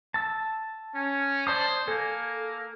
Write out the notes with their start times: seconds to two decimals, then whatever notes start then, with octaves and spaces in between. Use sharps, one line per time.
0.14 A5 E6
0.94 C#4
1.47 C5 D5 A5 D#6
1.88 A#3 A4 G#5